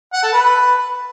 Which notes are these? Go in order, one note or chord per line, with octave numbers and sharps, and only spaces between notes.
F#5
A4
B4